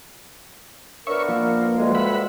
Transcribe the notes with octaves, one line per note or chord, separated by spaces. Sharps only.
B3 D4 A#4 C#5 E5 C#6
F3 A#3 F4
D2 G2 G#3
E5 F#5 B5